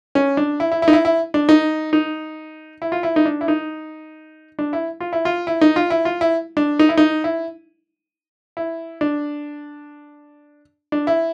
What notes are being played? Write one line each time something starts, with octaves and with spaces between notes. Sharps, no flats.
C#4
D4
E4
E4
E4
D#4
E4
E4
D4
D#4
D#4
E4
F4
E4
D#4
D4
E4
D#4
D4
E4
F4
E4
F4
E4
D#4
F4
E4
F4
E4
D4
D#4
E4
D#4
E4
E4
D4
D4
E4